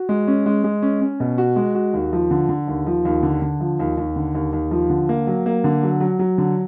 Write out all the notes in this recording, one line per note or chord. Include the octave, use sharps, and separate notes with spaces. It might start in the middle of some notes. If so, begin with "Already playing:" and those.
Already playing: F#4
G#3
C#4
G#3
G#3
C#4
C#4
B2
F#4
G#3
F#4
D#2
F3
D3
D3
D#2
F3
D#2
D3
D3
F3
D#2
D#2
D3
D#2
D#2
F3
D3
A#3
F#3
A#3
D3
F#3
F#3
F#3
D3